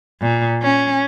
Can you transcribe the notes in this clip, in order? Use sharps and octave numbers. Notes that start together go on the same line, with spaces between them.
A#2
C#4